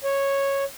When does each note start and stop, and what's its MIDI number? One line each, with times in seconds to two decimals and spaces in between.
0.04 0.64 73